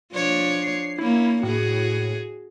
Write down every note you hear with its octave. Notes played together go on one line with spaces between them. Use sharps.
F3 D4 C#5
C7
A#3 C#4 E4
A2 F#4 G#4